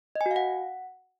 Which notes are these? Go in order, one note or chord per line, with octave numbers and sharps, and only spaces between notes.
D#5
G#5
F#4
F5
F#5